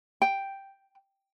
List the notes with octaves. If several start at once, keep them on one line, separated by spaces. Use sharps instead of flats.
G5